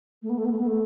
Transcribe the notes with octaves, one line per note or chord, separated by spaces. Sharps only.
A3
B3
A3
B3
A3
B3
A3